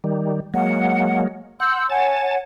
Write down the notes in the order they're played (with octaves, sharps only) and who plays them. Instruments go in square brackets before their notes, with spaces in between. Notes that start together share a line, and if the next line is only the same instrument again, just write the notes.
[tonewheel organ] D#3 G3
[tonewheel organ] F#3 G#3 A#3 [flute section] F#5
[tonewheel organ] F#5 [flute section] C6 E6 G6
[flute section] C#5 F#5 G#5 [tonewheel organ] A5